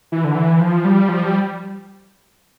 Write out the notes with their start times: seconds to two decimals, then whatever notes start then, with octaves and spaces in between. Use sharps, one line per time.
0.12 E3
0.24 D3
0.35 E3
0.60 F3
0.85 G3
1.09 F3
1.24 G3